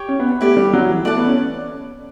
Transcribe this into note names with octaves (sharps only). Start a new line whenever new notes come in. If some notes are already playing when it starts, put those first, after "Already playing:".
Already playing: G4 C#5 G5 C#6
C#4
B3
B3
A3 E4 G4 D5
G3
F#3
E3
A3 D5 F#5 A5
B3
C#4